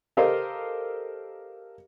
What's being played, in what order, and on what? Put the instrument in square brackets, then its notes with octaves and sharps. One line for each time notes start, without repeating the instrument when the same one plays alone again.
[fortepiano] G4 A4 A#4 C5 D#5 F5